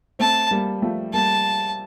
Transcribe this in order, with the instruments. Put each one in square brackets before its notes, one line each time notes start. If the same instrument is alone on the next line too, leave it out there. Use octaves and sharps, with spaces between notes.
[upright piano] A3 C4 [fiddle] A5
[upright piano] G3 A#3
F3 A3
[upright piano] G3 A#3 [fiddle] A5